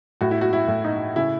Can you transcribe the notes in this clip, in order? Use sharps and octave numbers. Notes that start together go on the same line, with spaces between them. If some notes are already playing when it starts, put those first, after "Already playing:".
A2 F#4
E4
F#4
E4
A2
D#4
C#3 E4